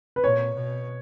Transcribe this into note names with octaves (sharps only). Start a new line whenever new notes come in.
B4
A#2 C#5
B2